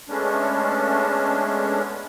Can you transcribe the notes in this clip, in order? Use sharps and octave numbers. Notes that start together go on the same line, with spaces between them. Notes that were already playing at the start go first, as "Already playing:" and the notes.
G#3 A3 B3 C#4 D4